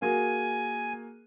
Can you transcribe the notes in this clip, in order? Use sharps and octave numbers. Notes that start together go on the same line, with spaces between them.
A#3 F#4 G#4 G#5